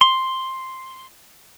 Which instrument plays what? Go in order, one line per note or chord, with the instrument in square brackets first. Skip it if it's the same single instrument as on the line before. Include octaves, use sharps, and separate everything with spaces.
[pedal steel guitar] C6